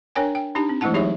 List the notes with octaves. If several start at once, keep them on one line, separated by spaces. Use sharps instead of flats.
D4 A#4 C#5 G5 G#5
G5
D4 D#4 G4 A5
C4
E3 G#3 A3 E4 F#5 A5
F#3 D#4 G4 G#4 C#5 E5